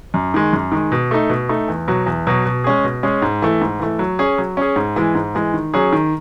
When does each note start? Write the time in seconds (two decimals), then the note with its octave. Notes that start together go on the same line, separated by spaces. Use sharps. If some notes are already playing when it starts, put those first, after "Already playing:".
0.14 F#2
0.34 D#3 G#3
0.53 F#2
0.72 D#3 G#3
0.92 B2
1.11 A3 D#4
1.29 B2
1.49 A3 D#4
1.68 E2
1.87 B2 F#3
2.06 E2
2.27 B2 F#3
2.46 B2
2.64 G#3 C#4 G#4
2.84 B2
3.03 G#3 C#4 G#4
3.22 G#2
3.42 E3 A3
3.61 G#2
3.80 E3 A3
3.99 F#3
4.19 C#4 G#4
4.38 F#3
4.57 C#4 G#4
4.76 G#2
4.96 E3 G#3
5.15 G#2
5.35 E3 G#3
5.54 D#3
5.74 F#3 C#4 G#4
5.93 D#3